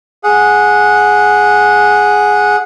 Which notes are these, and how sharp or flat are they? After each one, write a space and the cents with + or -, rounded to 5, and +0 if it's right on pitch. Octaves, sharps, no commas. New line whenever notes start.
G#4 +0 F#5 -15